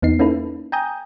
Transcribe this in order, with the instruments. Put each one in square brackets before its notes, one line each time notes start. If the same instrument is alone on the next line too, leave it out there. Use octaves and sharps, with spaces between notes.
[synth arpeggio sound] E2 B3 D#4 C7
A#3 C#4 D#4 E4 A4 B4
G5 G#5 A#5 D#6 G6